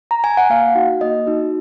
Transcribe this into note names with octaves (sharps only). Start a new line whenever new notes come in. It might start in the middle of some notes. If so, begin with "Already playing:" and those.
A#5
G#5
F#5
A#3 F5
D#4 F#4
A#3 D#5
D#4 F#4